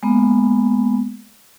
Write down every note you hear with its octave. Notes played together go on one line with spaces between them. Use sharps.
G#3 A#3 B3